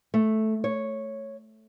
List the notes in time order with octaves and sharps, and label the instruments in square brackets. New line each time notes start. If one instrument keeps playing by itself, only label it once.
[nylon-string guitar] A3
C#5